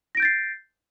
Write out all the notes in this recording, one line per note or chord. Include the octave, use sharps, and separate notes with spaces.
G6 A6 A#6 C7 D7